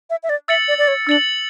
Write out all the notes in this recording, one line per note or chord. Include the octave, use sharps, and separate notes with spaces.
E5
E5
D5
E5 E6 A6 C#7 F#7
D5
D5
C#5
D4 E6 A6 C#7 F#7